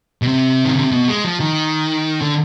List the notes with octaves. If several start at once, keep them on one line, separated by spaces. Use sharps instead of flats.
B2
C3
D#3
D3
C3
B2
G#3
F3
D#3
D3